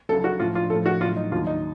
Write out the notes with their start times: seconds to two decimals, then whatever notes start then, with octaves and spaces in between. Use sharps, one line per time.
0.09 C#2 C#3 F#3 A4
0.24 F#4
0.40 A2 F3 F4
0.55 F4
0.70 A2 F3 A4
0.86 F#4
1.01 A2 F4
1.05 F#3
1.16 D#4
1.32 D#2 D#3 F#3 F4
1.47 D#4